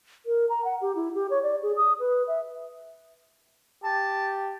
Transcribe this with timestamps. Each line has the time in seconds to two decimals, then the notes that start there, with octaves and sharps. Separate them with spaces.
0.26 A#4
0.49 A#5
0.65 F#5
0.81 G4
0.96 E4
1.15 G4
1.30 C#5
1.43 D5
1.63 G#4
1.77 D#6
2.00 B4
2.28 E5
3.84 G4 A5